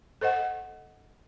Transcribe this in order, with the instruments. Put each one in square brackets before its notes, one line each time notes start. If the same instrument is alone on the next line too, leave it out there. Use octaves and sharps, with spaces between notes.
[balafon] A4 C5 D#5 F#5